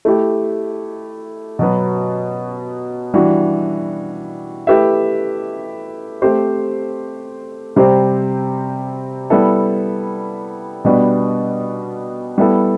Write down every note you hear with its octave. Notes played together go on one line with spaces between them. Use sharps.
A3 E4 G4
B2 F#3 B3
E3 G3 D4 F#4
A3 E4 G4 B4 E5
A3 C4 G4 C5
C3 G3 C4 G4 C5
G3 B3 E4 A4
B2 G3 B3 D4
G3 B3 E4 A4